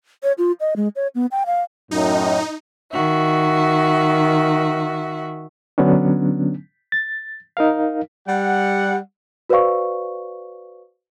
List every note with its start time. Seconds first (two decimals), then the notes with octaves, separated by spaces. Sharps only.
0.23 C#5
0.38 F4
0.60 D#5
0.76 G#3
0.96 C#5
1.15 B3
1.31 G5
1.46 F5
1.91 F#2 A2 D#4
2.92 D#3 F#4 E5
5.78 D3 F#3 B3 C#4 D4
6.92 A6
7.57 D#4 A#4 F5
8.26 G3 F#5
9.49 F#4 B4 C5 D5 F5 C#6